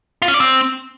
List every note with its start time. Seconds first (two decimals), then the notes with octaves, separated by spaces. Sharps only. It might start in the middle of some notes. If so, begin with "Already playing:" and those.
0.22 F4
0.28 C#4
0.34 D5
0.40 C4